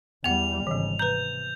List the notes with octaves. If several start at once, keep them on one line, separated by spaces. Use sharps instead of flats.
E2 G3 B3 F#5 F7
G#1 C#3 E3 G3
C3 B4 A#5 G6